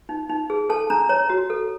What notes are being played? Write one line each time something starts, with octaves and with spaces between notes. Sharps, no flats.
D#4
D#4
G#4
A4 A5
D4 A#5
C#5 A#5
F#4
A4